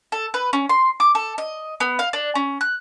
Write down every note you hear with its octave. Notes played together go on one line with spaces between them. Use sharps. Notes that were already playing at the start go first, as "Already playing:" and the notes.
A4
B4
C#4
C6
D6
A4
D#5
B3
F5
D4
C#4
F#6